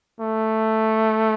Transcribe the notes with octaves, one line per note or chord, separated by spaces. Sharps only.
A3